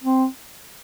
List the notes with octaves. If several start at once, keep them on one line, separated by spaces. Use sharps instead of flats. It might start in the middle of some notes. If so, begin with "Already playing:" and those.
C4